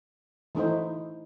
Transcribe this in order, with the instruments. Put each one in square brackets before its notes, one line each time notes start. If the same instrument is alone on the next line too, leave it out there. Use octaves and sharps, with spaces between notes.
[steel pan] E3 A3 D#4 E4 C5